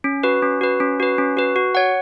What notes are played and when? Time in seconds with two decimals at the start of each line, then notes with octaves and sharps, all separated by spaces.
0.04 C#4
0.23 F#4 B4
0.42 C#4
0.61 F#4 B4
0.80 C#4
1.00 F#4 B4
1.18 C#4
1.37 F#4 B4
1.56 F#4
1.75 C#5 F#5